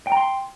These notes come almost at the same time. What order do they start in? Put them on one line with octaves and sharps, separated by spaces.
G5 A#5 C6